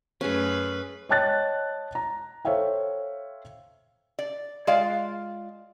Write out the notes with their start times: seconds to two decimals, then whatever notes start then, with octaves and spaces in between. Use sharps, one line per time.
0.21 F#2 A3 C#4 G#4 B4
1.09 C#5 D#5 G5 A5 F#6 A6
1.95 A#5
2.45 A4 C5 C#5 E5 F5 G5
4.19 D5
4.67 G#3 F4 D5 F5